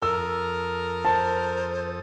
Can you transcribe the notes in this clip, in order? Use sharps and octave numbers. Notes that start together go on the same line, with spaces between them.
F2 A4 A#4 D#6 E6
C5 A5